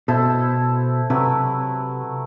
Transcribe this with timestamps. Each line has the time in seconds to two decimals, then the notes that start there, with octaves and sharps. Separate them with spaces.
0.08 B2 E4 A4 C5
1.10 C3 F#3 A3 E4 B4